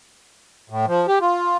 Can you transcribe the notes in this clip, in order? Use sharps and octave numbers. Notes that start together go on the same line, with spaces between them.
A2
F3
G4
F4